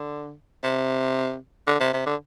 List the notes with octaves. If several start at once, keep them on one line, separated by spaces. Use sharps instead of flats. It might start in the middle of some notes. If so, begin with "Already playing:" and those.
Already playing: D3
C3
D3
C3
C3
D3